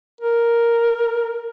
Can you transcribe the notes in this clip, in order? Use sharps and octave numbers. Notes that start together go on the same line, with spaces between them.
A#4